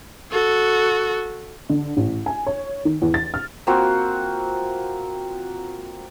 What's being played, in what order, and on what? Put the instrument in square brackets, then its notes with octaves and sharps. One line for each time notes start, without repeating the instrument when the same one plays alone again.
[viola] F#4 A4
[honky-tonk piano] D3
A1
G#5
C#5
D#3
E2
A6
F6
[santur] A#3 C4 F4 F#4